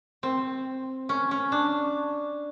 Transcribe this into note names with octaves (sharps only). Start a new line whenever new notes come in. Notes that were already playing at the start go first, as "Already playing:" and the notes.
C4
C#4
C#4
D4